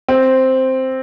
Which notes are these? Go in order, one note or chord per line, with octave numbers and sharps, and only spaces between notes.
C4